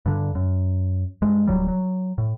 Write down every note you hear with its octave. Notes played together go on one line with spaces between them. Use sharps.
G2 D3
F#2
G2 G#3
D1 F#2 F#3 G3
F#3
A2